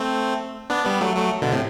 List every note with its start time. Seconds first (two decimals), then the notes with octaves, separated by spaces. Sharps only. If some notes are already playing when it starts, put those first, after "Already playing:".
Already playing: A3 C4
0.70 B3 D4
0.85 G3 B3
1.01 F#3 A3
1.16 F#3 A3
1.42 B2 D3
1.52 A2 C3